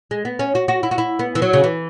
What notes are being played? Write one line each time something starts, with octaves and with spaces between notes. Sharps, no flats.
G#3
B3
C#4
F#4
F#4
E4
F#4
E4
B3
E3
F#3
C#3
E3